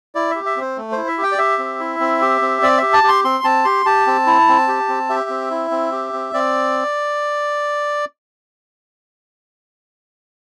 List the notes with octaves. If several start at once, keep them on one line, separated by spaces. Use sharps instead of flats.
E4 D5
G4 E5
E5
C4 C5
A3
E4 C5
E5
G4
G5
D5
G4 E5
C4
E4
C4
G4
C4
C4 D5
G4 E5
A5
G4 C6
C4 C6
C4 A5
G4 C6
G4 A5
C4
E4
C4
G4
C4
G4 E5
C4
E4
C4
G4
C4
C4 D5